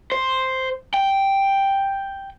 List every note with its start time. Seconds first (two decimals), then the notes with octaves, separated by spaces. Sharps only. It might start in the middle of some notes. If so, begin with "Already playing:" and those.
0.12 C5
0.94 G5